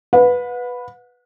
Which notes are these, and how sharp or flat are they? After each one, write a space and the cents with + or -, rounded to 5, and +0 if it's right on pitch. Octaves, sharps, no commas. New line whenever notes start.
B4 +0 F#5 -40